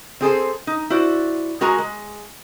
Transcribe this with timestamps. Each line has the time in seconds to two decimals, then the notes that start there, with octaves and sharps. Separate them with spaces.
0.21 C4 G#4 A4 C5
0.67 D#4
0.90 E4 F#4 C5 D5
1.61 G#3 F#4 A#4 G#5 A#5
1.78 G#3